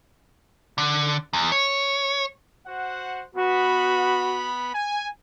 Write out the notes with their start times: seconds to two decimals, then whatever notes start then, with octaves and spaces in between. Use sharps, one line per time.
0.78 D3
1.33 E2
1.52 C#5
2.66 F#4 C5 F#5
3.35 B3 F#4 B5
4.75 G#5